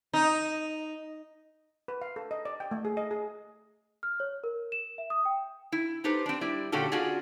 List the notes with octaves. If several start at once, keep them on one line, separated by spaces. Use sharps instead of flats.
D#4
B4
F5
A4
D#5
D5
G5
A3
G#4
D#5
G#4
F6
C#5
A#4
E7
E5
D#6
G5
E4
D#4 G4 A4 B4 C5
C4 D4
G3 E4 D5
A#2 D3 C#4 F#4 G4 A4
C#4 D4 F4 F#4 G#4 D5